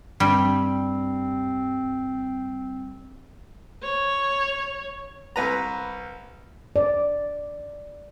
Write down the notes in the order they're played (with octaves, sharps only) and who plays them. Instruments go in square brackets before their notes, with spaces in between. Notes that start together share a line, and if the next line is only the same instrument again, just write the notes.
[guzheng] G2 [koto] G3 [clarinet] C4
[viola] C#5
[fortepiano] C2 B4 A#5
[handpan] D5